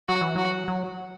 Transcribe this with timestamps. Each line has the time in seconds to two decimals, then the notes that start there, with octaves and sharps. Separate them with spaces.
0.08 F#3 F#4
0.21 E3
0.36 F#3 F#4
0.68 F#3